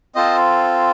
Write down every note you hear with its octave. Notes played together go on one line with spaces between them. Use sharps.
C4 F4 A4 C5 D#5